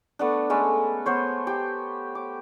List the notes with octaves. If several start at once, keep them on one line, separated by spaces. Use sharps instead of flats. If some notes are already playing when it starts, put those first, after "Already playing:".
A3 B3 D4
G#3 A3 C#4 B4
B3 C5 C#5
G4
D6